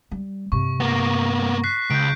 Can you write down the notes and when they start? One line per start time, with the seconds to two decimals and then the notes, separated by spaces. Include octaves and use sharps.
0.11 G3
0.52 G2 C3 C#6
0.80 A#3 B3 A#6
1.63 F#6 B6 C7
1.90 C#2 G6 D7